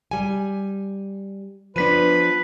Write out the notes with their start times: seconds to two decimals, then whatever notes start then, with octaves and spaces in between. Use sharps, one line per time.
0.11 G3 G#5
1.76 F3 B3 D4 B4 B6 D#7